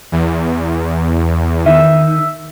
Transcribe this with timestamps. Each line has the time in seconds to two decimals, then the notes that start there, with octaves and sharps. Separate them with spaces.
0.12 E2
1.66 D#3 E5